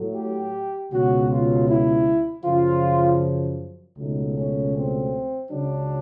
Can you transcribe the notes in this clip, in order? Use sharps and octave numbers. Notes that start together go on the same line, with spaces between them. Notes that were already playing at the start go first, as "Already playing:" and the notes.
Already playing: A2 F#3 A3
G4
C#2 B2 F#3 F#4
F4
E4
F#2 C#3 F3 F4
C#2 B2 F#3 A3 D#4
C#4
C4
C#2 C#3 F#3 D4